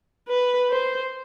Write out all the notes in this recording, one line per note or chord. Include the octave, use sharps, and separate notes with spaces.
B4
C5